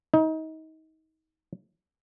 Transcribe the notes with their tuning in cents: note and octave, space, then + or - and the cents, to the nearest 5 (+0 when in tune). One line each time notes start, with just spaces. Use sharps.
D#4 +30